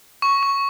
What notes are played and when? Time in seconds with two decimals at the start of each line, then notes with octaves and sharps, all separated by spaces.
0.22 C#6
0.43 C#6